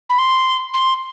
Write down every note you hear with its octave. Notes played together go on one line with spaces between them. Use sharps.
B5
C6
C6